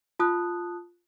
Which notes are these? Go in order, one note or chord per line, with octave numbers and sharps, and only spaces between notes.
F4 A5 D#6 F#6